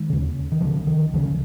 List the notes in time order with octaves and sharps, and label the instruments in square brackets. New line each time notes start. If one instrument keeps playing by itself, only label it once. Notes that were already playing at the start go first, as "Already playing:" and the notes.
Already playing: [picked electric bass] D#3 G#3
D#2 C#3
D#3
C#2 C#3 F3
D#3
C#2 C#3 F3